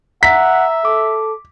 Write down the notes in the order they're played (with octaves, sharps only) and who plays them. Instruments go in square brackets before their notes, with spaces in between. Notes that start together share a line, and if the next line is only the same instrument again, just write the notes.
[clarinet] E5 [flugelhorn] F#5 [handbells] A#5 [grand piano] B6
[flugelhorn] A4 [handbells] D6